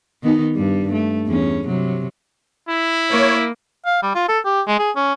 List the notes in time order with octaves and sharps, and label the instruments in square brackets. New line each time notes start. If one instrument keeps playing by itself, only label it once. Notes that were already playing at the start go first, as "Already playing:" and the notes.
[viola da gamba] D#3 B3 D#4
G2 G3
A3
E2 C#4
C3 F#3
[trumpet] E4
[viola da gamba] A#3 [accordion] C#5
[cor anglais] F5
G3
F4
A4
G4
G#3
G#4
C#4